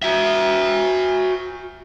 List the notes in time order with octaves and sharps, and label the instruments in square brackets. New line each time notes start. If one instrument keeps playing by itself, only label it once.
[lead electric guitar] F#4 E5